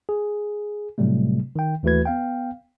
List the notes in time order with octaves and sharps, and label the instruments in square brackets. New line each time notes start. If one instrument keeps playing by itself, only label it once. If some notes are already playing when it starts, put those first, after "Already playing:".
[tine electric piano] G#4
A2 C3 F#3 G3 A3
D#3 G5
D#2 E3 A3 F#4 B4 G#6
B3 F5 G5